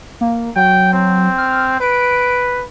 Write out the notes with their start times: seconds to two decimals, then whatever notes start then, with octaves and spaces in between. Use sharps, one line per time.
0.21 A#3
0.56 F#3 G5
0.93 C4
1.38 F6
1.81 B4 D7